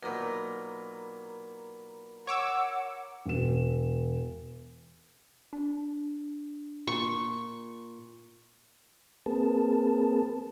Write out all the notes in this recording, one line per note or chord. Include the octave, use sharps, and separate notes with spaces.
B1 A#2 A#4 A#5 B5
C#5 F#5 D6 E6
E1 E7
D4
A#2 C#6
A#3 C4 G#4 A#4 B4 A5